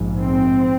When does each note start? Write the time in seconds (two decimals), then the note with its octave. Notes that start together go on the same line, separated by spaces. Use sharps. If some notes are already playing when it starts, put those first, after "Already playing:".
Already playing: A#1 G#2
0.19 C4